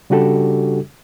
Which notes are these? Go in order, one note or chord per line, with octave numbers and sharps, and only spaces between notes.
C#3 G3 D4 F#4 G4 A4